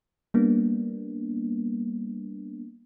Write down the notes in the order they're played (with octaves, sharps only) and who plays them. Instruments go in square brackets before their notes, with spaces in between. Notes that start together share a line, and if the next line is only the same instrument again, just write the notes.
[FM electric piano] G3 A#3 B3 D4